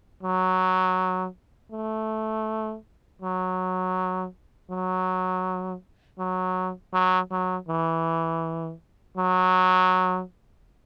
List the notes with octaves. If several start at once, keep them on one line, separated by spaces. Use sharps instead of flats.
F#3
A3
F#3
F#3
F#3
F#3
F#3
E3
F#3